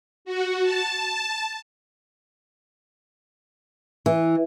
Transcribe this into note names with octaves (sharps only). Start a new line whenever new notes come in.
F#4
A5
E3